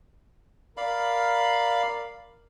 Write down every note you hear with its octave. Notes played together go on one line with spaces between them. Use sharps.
A#4 D5 F5 B5